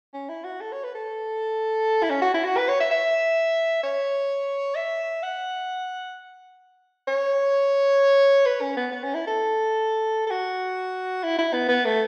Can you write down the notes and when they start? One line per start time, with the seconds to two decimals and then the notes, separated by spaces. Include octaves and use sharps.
0.14 C#4
0.29 E4
0.44 F#4
0.61 A4
0.72 C#5
0.84 B4
0.95 A4
2.02 E4
2.10 C#4
2.22 F#4
2.34 E4
2.44 F#4
2.57 B4
2.69 C#5
2.80 E5
2.91 E5
3.83 C#5
4.75 E5
5.23 F#5
7.08 C#5
8.46 B4
8.61 C#4
8.77 B3
8.92 B3
9.03 C#4
9.14 E4
9.27 A4
10.26 A4
10.30 F#4
11.23 E4
11.38 E4
11.53 B3
11.68 B3
11.85 A3